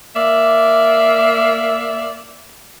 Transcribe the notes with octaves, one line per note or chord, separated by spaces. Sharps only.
A#3 D5 E5